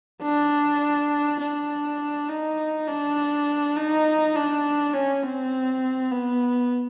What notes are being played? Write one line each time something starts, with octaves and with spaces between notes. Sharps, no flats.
D4
D4
D#4
D4
D#4
D4
C#4
C4
B3